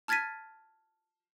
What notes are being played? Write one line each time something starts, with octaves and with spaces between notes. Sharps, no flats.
A5 F6 G#6 A6 B6 D#7